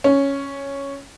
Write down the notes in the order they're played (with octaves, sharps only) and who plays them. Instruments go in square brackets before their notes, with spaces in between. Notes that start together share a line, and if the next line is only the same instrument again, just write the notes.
[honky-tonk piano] C#4